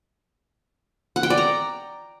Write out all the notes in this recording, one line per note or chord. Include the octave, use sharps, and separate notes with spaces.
F#5
G5
D5
A#5